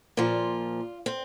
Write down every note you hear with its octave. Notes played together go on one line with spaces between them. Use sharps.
A#2 F3 F4
C4